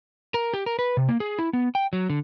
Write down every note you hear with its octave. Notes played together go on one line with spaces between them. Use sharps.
A#4
G4
A#4
B4
C3
A#3
G#4
E4
B3
G5
F#3
D3